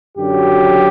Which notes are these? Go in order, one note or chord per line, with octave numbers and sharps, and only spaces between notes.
F#2 D3 F#3 G4